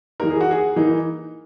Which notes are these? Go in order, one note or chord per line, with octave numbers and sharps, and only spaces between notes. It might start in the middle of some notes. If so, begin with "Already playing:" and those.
E3 A#3 D#4 A#4
G#4
F#4
G#4
E3 A#3 D#4